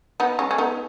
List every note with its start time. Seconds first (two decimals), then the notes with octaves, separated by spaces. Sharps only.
0.20 B3 D#4
0.39 G#3 C#4
0.51 C#4
0.58 B3 D#4